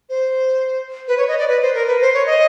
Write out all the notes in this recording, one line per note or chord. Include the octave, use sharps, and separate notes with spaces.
C5
B4
C#5
D#5
D5
B4
C5
A#4
B4
C5
C#5
D#5